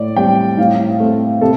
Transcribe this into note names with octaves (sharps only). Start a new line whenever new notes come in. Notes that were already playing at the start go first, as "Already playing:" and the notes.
Already playing: A2 D5
G3 C4 G5
A2 F5
A3 C4
C3 A4